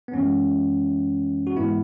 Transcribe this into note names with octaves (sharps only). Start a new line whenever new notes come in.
B3
F#2 E3 G#3 C#4
F#4
G#2 E3 G#3 B3 E4